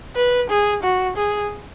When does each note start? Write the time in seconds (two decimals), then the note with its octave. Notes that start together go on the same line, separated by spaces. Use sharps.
0.16 B4
0.50 G#4
0.83 F#4
1.16 G#4